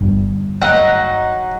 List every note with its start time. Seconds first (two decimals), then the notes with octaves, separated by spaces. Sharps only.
0.01 G1 G2 G3
0.62 F#3 D#4 F#5